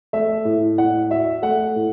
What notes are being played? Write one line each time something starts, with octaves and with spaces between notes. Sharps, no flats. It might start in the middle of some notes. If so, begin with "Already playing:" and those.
A3 E5
A2
A2 F#5
F#4 E5
A3 F#5
A2